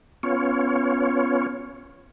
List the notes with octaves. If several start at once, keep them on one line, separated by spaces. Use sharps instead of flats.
B3 C#4 F4 C#5